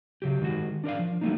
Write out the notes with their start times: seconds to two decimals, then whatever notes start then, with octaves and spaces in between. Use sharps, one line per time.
0.22 C#3 F#3 G4
0.42 D#3 G#3 F#4
0.84 D4 A#4 D5 F5
0.99 F3
1.21 F#3 G3 A3 A#3 D4 D#4